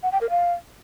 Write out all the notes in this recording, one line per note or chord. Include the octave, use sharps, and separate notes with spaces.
F#5
G5
A#4
F5